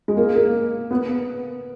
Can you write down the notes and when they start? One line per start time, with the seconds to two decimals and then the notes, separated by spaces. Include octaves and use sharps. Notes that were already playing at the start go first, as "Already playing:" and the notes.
0.08 G#3
0.17 A#3
0.35 A#3
0.91 B3